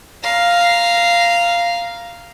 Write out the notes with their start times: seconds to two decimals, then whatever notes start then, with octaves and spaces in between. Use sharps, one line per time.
0.24 F5 A#5